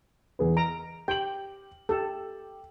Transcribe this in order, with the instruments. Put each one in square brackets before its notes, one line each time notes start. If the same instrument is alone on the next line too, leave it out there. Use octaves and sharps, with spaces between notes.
[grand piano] E2 G#4 B4
[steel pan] A#5 [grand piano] D7
[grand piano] G4 F#7 [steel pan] G5
[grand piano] G4 [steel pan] A4